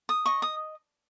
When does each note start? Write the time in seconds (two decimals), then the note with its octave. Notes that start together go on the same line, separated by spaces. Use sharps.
0.09 D#6
0.26 D#5 C#6
0.42 D#6